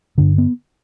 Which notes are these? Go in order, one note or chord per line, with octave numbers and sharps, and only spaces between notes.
G2 D3 D4
B3